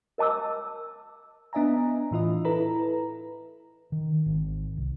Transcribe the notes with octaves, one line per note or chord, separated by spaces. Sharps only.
A#4 D#5 A5 D6 E6
B3 D4 D#5 E5 G#5 A#5
A2 E3 F4 D#5
E4 A4 B4 A#5
D#3
G#1
C2